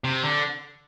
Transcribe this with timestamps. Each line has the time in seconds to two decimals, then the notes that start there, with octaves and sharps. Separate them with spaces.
0.04 C3
0.23 D3